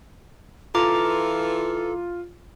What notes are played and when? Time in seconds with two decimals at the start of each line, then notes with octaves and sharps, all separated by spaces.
0.75 E3 F4 A4 A#5 D6